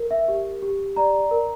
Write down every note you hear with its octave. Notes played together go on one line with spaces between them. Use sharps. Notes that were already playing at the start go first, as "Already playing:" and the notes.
Already playing: A#4
E5
G4
G4
D5 A#5
A#4